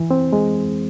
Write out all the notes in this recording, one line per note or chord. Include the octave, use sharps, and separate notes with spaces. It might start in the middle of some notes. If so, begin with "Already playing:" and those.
Already playing: E3
C4
G#3